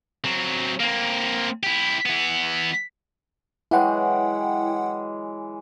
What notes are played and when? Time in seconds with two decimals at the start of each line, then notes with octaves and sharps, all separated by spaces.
0.24 F#3 C4
0.80 A#3 C4
1.63 E4 G4
2.06 E3 B3
3.71 E3 F#3 G#3 E4 F#5 G5